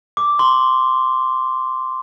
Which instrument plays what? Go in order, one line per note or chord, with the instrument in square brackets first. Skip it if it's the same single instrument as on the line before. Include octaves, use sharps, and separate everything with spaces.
[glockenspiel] D6
C6